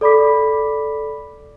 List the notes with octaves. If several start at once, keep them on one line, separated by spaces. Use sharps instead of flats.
A4 D5 B5 D6 B6